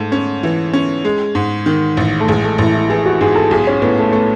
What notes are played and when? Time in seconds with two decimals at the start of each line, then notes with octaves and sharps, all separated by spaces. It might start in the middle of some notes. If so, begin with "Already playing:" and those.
Already playing: G#2 A3
0.12 C#4
0.43 E3
0.73 C#4
1.05 G#3
1.35 G#2
1.66 D#3
1.97 A1
2.20 A3
2.28 A1 G#3
2.44 A3
2.58 A1 E4
2.74 E4
2.90 E3 G#4
3.06 F#4
3.21 G#2 G#4
3.35 A4
3.51 B1 G#4
3.67 C#4
3.82 A2 B3
3.98 A3
4.13 A3 B3